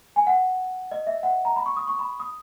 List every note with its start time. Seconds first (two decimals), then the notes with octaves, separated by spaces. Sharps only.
0.16 G#5
0.27 F#5
0.92 D#5
1.07 E5
1.23 F#5
1.45 A#5
1.56 B5
1.66 C#6
1.77 D#6
1.87 C#6
1.99 B5
2.20 D#6